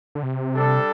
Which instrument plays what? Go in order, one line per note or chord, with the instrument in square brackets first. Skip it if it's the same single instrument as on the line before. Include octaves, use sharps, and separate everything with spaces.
[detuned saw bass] D3
C3
[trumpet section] G3 D4 A4